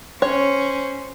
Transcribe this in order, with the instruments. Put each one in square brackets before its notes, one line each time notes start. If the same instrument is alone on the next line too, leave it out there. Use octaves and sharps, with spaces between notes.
[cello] C#4 [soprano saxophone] C5 [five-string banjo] C#5